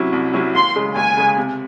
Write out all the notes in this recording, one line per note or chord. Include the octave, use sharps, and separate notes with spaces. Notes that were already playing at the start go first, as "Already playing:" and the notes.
Already playing: C3 F#3 C#4 E4
C2
C3 F#3 C#4 E4
D#2 C6
C#3 G#3
D#2 G#5
C#3 G#3
C3